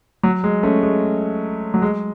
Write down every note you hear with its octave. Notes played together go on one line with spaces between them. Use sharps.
F#3
G#3
A3 C#4
G#3
F#3
G#3